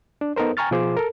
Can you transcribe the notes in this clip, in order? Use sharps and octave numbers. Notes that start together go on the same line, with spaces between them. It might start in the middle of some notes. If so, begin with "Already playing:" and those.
D4
B3 D#4 A4 A#4 C5
G5 G#5 A#5 C#6 F6 A6
B2 F3 F4 G#4 C5 D6
A4 A#4